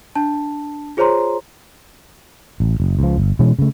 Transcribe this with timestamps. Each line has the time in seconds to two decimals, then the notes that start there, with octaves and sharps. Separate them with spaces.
0.15 D4 A5
0.97 F4 G#4 C5 C#5 A#5 C6
2.60 A1
2.80 F#1
2.99 C#2 F3
3.18 G1
3.39 B2 E3 G#3 C#4
3.59 C#3 A3